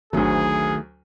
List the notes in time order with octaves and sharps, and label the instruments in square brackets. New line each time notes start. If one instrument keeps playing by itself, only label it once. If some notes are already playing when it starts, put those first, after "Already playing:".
[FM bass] G#1 [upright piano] D2 F#3 [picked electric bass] D#3 A3 [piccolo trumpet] G#4